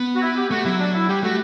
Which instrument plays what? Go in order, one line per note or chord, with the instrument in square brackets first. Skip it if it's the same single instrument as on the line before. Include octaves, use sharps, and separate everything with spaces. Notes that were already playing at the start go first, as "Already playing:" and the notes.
Already playing: [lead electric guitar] B3
[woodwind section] F#4
E4
G4
[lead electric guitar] A3 [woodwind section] F#4
[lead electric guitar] F#3 [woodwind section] E4
[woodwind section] D4
E4
[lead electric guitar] G3 [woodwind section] G4
[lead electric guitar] A3 [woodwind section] F#4